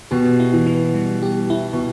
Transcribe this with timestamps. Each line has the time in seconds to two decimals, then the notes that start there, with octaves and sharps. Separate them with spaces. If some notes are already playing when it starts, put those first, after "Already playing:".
0.11 B2 G4
0.40 E4
0.53 E3
0.67 B3
0.94 G3
1.22 G4
1.50 E4
1.73 B2